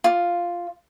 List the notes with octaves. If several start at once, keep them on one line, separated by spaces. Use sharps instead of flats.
F4